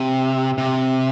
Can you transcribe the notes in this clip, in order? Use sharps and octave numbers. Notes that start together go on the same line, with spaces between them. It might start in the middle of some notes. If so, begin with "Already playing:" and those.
Already playing: C3
C3